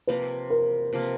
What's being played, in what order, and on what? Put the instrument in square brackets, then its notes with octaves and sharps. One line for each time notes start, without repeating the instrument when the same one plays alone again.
[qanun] C3 F3 A#3 [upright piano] B4
[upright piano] A#4
[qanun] C3 F3 A#3